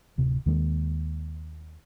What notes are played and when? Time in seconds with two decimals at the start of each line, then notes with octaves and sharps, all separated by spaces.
0.18 D1 C3
0.46 D#2 D#3 G#3 A#3